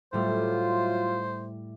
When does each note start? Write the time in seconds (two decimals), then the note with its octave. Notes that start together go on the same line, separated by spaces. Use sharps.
0.13 A2 F#3 G3 A3 F4 C5